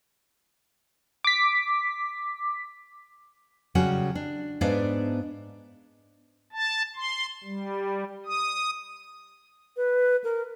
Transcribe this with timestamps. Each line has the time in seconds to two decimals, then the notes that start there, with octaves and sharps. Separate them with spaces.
1.24 D6 B6
3.75 C#3 F#3 G3 C#4 F#4
4.15 D4
4.61 G#2 B3 D4 D5 F5
6.52 A5
6.96 C6
7.44 G3
8.26 D#6
9.77 B4
10.24 A#4